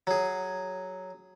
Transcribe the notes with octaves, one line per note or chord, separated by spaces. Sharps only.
F#3 G#4